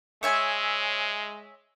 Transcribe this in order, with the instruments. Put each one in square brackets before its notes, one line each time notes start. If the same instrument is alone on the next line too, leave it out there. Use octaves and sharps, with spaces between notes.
[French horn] G#3 [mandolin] C#5 E5 G#5